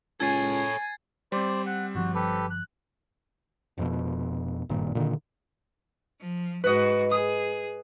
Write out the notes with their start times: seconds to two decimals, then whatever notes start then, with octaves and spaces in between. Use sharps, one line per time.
0.20 C#2 A4 C#5 G#5 G#6 A6 C7
1.32 G3 C4 C5 D5
1.66 F#5
1.95 G1 F3 F#4
2.15 G4 A4 B4
2.50 F#6
3.78 F1 F2 B2
4.69 G#1 G2 A#2 D#3
4.95 A#2 D3 D#3
6.21 F3
6.64 G#2 F#4 B4 D#5
7.11 G#4 D#6